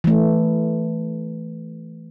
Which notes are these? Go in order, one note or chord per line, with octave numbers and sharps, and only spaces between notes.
E3 A3